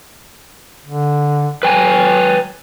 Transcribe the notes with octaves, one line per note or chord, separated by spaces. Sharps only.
D3
F#3 B4 G5 G#5